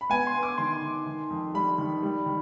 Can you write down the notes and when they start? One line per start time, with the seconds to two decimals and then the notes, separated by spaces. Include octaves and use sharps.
0.01 B5
0.10 B3 G#5
0.27 C6
0.35 B3
0.43 D6
0.58 D#3 C6
0.82 D#3
1.06 D#3
1.30 F2
1.54 G3 B5
1.78 D#3
2.03 G3
2.26 D#3